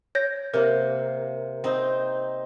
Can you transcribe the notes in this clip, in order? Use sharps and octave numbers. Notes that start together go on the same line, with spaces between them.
C#5 G6 A#6
C3 A#3 A#4
C4 D#4